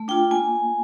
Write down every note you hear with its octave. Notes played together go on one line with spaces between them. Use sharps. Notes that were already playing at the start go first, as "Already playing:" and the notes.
Already playing: A3
D4 F4 G5
A#3 G#5